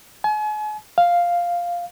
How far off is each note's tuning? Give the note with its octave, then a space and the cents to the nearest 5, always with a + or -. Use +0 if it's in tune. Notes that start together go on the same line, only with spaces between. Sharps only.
G#5 +40
F5 +0